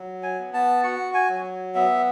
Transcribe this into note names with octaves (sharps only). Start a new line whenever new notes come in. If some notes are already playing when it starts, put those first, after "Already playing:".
Already playing: F#3
G#5
B3
A5
F#4 F#5
G#5
F#3
B3 E5